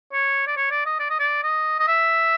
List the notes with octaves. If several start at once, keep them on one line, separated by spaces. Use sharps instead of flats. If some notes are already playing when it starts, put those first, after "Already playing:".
C#5
D5
C#5
D5
D#5
D5
D#5
D5
D#5
D#5
E5